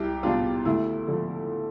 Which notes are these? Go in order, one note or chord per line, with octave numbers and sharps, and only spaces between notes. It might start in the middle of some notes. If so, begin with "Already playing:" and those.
Already playing: C2 E4 G4
C3 G3 B3 D4 F4
D2 E4
D3 F3